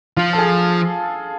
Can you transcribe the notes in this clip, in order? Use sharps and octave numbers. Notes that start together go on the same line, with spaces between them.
F3 F4
A4
G#4